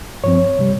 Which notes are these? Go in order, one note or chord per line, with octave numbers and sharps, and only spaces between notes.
G2 F3 C4 C#5
C3 G3